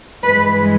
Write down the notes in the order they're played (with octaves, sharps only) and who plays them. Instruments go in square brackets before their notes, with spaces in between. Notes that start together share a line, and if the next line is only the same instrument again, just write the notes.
[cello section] G2 E3 G#3 B4